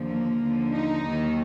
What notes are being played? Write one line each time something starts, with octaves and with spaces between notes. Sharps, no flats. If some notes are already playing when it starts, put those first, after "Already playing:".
Already playing: D#2 D3 F3
A#3
D#2 D3 F3
D#4
D#2 D#3 F#3